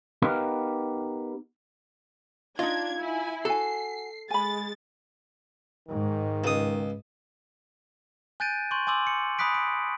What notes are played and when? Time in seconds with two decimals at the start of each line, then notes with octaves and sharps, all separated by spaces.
0.22 B3 D#4 G4 A#4 B4 F5
2.59 D4 D#4 F4 D#5 G#6
2.99 E4 G#5
3.45 F#4 A4 G#5 C7
4.30 G#3 G#5 B5 A6
5.88 G#2 D#3
6.44 C#2 D#6
8.40 G#5 F#6 G6 A6 D7 D#7
8.71 C6 C#6 G6 F#7
8.87 G#5 C6 D6 E6 F#7
9.07 C#7
9.39 G#5 B5 D#6 F#6 B6 D7
9.55 D7